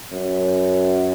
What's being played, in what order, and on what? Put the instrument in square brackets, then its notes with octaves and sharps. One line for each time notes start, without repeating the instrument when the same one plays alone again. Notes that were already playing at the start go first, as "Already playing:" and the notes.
[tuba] F#2